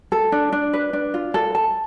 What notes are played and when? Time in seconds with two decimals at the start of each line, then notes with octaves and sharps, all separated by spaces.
0.12 A4
0.32 D4
0.52 D4
0.74 B4
0.93 D4
1.14 F4
1.34 A4
1.55 A5